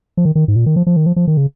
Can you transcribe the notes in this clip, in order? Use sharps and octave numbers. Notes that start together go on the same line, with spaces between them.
F3
D#3
D#3
G#2
A#2
D#3
F3
F3
D#3
F3
F3
D#3
C#3